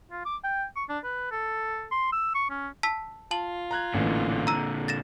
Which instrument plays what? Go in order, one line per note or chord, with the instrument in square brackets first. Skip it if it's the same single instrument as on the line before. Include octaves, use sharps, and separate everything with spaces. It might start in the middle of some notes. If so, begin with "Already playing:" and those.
[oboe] F4
D6
G5
C#6
D4
B4
A4
C6
E6
C#6
C#4
[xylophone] A5 E6 B6
[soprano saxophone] F4 [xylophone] A5 F#7
[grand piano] A#5 F#6 G#6
[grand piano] A1 E3 [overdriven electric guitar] A#2 D3
[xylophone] A#5 E6 [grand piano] D#7
[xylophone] A6 A#6 E7